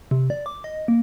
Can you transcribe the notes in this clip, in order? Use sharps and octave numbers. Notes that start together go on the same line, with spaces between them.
C3
D5
D6
D#5
A#3